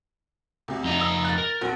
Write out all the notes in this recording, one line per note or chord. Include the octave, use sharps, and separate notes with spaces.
D2 C3
F2 D#4 A#5
D#6 E6
F#6 A6
A#4
B1 C4 F#4